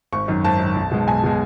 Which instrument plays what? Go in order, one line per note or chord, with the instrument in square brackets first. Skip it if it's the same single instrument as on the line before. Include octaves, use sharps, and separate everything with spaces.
[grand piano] G#1 C#6
F#2 D#3
G#1 A5
F#2 D#3
B1
B2 G#3
B1 G#5
B2 G#3